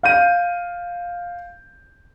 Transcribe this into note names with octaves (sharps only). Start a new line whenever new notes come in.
F5 G6 D#7